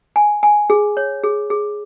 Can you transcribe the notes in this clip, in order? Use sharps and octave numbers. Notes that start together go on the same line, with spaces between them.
G#5
G#5
G#4
C#5
G#4
G#4